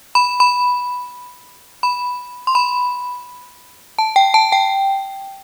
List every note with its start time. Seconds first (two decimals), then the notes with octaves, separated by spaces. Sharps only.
0.15 B5
0.40 B5
1.83 B5
2.47 C6
2.55 B5
3.99 A5
4.16 G5
4.34 A5
4.52 G5